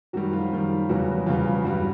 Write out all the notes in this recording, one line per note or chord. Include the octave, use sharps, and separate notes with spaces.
F#2 D#3 F#3 G3 F#4
F3 F4
F#2 D#3 G3
E2 C#3 E3 F#3 G3 F#4
E2 C#3 E3 F3 G3 F4
G2 E3 F#3 G3 F#4